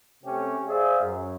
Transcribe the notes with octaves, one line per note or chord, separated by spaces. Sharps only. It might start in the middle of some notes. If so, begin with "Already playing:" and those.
C3 A3 C4 C#4 G4
G#4 C5 D5 E5 F5
F#2